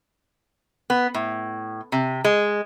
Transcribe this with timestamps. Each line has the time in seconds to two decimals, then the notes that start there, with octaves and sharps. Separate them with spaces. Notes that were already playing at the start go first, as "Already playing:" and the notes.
0.90 B3
1.14 A2
1.92 C3
2.25 G#3